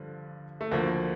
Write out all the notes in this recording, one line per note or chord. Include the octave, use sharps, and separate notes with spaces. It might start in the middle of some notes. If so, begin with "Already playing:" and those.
Already playing: G2 D3 F3
A3
D2 D3 F3 A#3